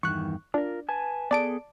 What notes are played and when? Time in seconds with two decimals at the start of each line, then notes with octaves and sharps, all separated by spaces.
0.03 E2 G2 D#3 C#6 F#6
0.54 D4 F4 A#4
0.89 B4 G#5 A5
1.31 B3 G#4 A4 D5 A5 D7